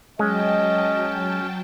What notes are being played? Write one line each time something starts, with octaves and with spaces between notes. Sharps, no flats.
F#3 G#3 C#4 D#5 G5 A5